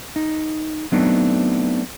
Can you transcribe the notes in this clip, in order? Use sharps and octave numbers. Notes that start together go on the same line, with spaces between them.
D#4
F#3 A3 B3 C4 D4 D#4